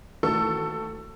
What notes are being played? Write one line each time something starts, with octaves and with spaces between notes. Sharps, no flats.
D#2 E3 A3 F#4 A4 C#6